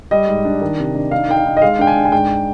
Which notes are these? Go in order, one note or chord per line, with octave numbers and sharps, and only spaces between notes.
G3 D#5
G#2
D4
D#3
C3
D4
D#4 F5
D#4 G5
F5
D#4
D#5
G#3 F5
D4 G5
G#5
D4
G#5
G#2 G5